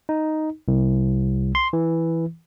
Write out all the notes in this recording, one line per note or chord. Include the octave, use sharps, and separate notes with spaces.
D#4
C2
C6
E3